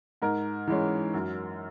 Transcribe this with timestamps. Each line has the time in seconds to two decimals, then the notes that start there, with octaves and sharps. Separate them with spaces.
0.22 G#2 A#4
0.67 E3 G#3 C#4
1.14 F#2